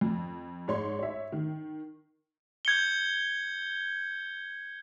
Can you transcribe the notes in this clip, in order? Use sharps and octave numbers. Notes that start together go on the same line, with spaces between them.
F2
G#2 C#5 C6
C#5 E5
D#3
G6 G#6 C#7 G7